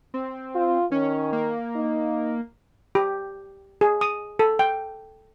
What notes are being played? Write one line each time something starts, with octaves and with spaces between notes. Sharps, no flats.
C4
F4
D#3 C#4
A#3
D#4
G4
G#4
D#6
A4
G5